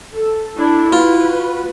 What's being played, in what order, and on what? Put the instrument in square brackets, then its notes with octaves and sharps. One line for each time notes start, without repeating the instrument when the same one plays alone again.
[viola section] A4
[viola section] D4 A4 [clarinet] E4
[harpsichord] F4 [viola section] F#4 B4